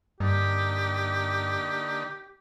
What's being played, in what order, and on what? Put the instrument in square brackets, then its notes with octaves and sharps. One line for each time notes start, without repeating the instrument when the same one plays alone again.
[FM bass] G2 [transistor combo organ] D3 A#3 D#4 [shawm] G4